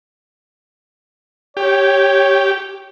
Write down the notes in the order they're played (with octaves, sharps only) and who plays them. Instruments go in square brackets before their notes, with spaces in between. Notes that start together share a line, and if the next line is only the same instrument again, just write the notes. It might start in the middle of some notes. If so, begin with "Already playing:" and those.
[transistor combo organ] G4 [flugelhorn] C#5